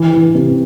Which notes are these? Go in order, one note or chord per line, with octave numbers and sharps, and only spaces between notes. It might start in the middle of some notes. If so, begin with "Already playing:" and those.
Already playing: E3
E3
C3